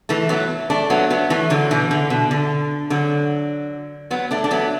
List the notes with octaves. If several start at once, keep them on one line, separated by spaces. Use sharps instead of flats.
E3 A3
F#3 B3
A3 D4
F#3 B3
F#3 B3
E3 A3
D3 F#3
B2 E3
D3
B2
D3
D3 F#3
F#3 B3
A3 D4
D4
F#3 B3